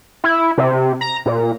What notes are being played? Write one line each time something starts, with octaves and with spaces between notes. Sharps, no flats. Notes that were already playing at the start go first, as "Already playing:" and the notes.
E4
C3
A#5
A#2